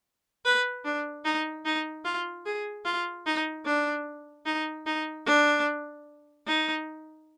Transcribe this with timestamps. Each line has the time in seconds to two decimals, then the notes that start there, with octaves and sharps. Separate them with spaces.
0.45 B4
0.85 D4
1.25 D#4
1.65 D#4
2.05 F4
2.46 G#4
2.85 F4
3.26 D#4
3.65 D4
4.46 D#4
4.86 D#4
5.26 D4
6.47 D#4